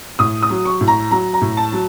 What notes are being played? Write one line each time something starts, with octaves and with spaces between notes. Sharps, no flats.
A2 D#6
D#6
F#3
C#6
A2
A#5
F#3 A#5
A#5
A2
A5
F#3